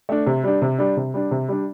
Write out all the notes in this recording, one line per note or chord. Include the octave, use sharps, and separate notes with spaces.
A3 D4
C3
G3 D4
C3
G3 D4
C3
G3 D4
C3
G3 D4